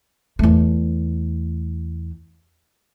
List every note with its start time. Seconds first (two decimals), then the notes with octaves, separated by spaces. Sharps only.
0.39 E2 A3